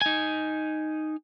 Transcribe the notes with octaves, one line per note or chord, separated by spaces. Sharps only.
D#4 G#5